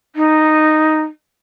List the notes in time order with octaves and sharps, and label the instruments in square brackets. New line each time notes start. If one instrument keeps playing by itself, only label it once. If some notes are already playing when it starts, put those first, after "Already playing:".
[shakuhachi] D#4